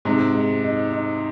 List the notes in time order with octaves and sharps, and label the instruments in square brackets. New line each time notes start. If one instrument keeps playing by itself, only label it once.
[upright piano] G#2 C3 [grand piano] G#3
[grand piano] G#3
D#4
D#4